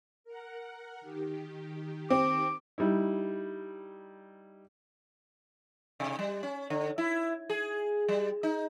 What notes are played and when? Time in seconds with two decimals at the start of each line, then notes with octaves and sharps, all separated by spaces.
0.24 A#4 F#5
1.01 D#3 G4
2.10 C4 D6
2.78 G3 D#4 E4
6.00 C3
6.19 G3
6.43 C#4
6.70 D3
6.98 E4
7.50 G#4
8.08 G3
8.43 D#4